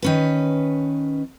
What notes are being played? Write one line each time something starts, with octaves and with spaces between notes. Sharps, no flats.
D#3 C#4 B4